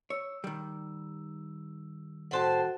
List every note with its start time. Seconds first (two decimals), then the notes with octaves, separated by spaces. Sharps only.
0.10 C#5 E6
0.44 D#3 G3
2.31 A2 F#4 A4 C5 F#5 A5